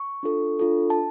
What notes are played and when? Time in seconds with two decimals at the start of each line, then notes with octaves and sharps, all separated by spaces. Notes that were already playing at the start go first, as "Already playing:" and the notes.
Already playing: C#6
0.23 D4 F4 A4
0.59 D4 F4 A4
0.90 A5